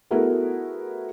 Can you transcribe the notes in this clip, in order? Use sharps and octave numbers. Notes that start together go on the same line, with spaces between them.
A3 B3 E4 F#4 G#4 A#4